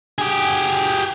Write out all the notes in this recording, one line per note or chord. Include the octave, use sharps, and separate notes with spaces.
G4 G#4